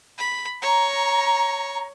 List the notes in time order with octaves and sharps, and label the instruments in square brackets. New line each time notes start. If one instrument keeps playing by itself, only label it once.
[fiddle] B5
[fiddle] C#5 [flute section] A#5